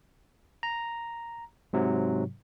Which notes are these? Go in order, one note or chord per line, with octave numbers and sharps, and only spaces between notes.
A#5
G#2 C3 F#3